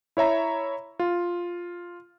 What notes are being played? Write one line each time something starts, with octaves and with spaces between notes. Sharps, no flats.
E4 C#5 E5 A#5
F4